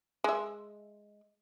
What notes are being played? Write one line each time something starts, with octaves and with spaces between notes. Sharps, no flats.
G#3 E5